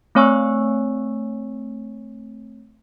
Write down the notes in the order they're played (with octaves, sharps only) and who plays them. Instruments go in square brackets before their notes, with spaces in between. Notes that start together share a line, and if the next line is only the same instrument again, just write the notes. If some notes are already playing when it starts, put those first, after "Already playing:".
[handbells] A3 C4 C#5 G#5 C#6 E6